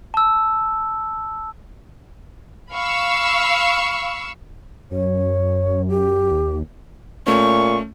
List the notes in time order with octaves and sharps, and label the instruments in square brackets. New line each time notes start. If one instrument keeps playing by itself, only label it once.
[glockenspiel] A5 E6
[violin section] F5 B5 C#6 E6
[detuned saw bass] F#2 [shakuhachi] C#5
[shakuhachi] G4
[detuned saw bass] D#2
[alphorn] A#2 [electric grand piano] A3 C#4 [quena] C#6